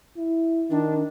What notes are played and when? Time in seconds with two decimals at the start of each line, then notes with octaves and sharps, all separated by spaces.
0.17 E4
0.70 D#3 D4